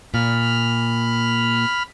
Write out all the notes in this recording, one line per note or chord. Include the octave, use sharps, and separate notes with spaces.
A#2 B5 F6